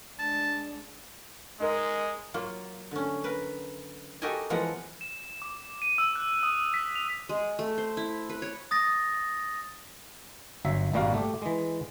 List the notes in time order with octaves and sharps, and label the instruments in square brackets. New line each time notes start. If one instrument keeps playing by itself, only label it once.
[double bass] G#3 D4 [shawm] A5
[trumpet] G#3 [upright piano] D#4 A#4
[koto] F#3 A#3 F4
D3 C#4
A#4 B4
F#4 G4 A4 A#4 D#5 G#5
E3 F3 G#3 B3 A#4 F#5
[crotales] E7
D6
D#7
E6
F#6
D#6
B6
F7
[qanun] G#3
A3
C5
E4
B4
C#5
[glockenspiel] D#6 A6 A#6
[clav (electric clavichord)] G1 F#3 E5
G#1 A#2 G3 A#3 F#4 F5
A3 G4
E3 G#3